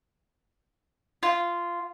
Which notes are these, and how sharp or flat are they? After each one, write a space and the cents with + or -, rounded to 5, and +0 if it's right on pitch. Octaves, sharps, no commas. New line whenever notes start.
F4 -15